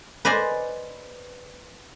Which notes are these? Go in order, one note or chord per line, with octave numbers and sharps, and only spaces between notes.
B4 C5 D5 D#5 G#5